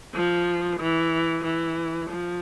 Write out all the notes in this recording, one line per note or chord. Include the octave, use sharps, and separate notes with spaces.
F3
E3
E3
F3